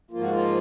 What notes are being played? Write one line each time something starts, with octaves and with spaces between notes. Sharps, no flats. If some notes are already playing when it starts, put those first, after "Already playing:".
G#2 F3 A#3 F4
F#4
F4